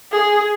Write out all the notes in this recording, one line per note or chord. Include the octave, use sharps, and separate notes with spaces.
G#4